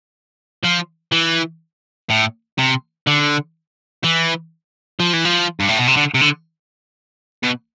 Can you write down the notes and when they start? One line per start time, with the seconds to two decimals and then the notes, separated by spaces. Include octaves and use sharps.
0.64 F3
1.12 E3
2.10 A2
2.58 C3
3.07 D3
4.04 E3
5.00 F3
5.13 E3
5.25 F3
5.60 G2
5.69 A2
5.78 B2
5.88 C3
5.97 D3
6.14 C3
6.21 D3
7.43 B2